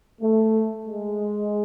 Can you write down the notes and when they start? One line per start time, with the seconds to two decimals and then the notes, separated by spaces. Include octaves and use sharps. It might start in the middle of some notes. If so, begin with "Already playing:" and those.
0.21 A3
0.87 G#3